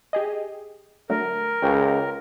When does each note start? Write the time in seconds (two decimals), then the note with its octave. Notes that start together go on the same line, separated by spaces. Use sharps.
0.13 G4 G#4 D#5
1.10 D3 F#3 A3 A#4
1.62 C#2 C#5 G5